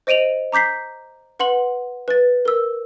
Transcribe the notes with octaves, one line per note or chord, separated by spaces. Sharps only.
C5 D#5 D7 D#7 F7 F#7
A#5 D6 G6 B6 C7
B4 F#5 C6 F#7
B4 A6
A#4 E6